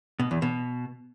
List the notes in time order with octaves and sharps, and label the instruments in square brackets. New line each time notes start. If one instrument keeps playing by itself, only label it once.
[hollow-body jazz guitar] B2
E2
B2